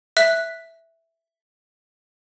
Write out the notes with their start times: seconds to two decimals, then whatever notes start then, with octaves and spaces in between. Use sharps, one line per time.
0.17 E5 F#6 B6